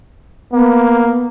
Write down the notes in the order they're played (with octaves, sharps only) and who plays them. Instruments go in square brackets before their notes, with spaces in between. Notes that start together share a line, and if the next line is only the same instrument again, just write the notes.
[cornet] A#3 [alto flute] B3